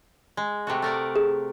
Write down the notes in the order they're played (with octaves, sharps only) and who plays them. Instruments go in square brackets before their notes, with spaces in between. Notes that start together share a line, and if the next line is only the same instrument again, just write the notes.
[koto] G#3
C3 A3 F#4
A3 A#4 D5
[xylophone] G#4